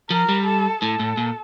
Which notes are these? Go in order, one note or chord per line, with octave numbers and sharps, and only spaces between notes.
F3 A#4
G3
A4
A2 A4
A2
A#2